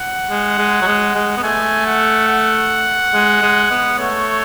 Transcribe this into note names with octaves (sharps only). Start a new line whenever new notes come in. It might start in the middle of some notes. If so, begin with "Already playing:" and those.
Already playing: F#5
G#3
G#3
F#3
G#3
G#3
B3
A3 G#5
F#5
F#5
G#3
G#3
B3
A3 C#5